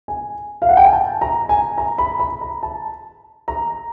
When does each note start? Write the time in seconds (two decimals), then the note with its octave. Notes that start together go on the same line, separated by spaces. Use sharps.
0.08 G#5
0.62 F5
0.69 F#5
0.77 G5
0.84 G#5
0.93 A5
1.21 A#5
1.49 G#5
1.78 A#5
1.98 B5
2.19 B5
2.41 A#5
2.63 A5
3.48 A#5